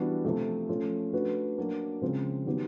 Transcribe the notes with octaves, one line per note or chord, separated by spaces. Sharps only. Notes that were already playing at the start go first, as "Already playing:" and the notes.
Already playing: E3 G3 B3 D4 F#4
C3 F3 A3
F3 A3 C#4 F4
A3 D4 F#4 B4
F#3 A#3 D4 F#4
C#3 F3 G#3 C4 F4
D#3 F#3 B3 D#4 G4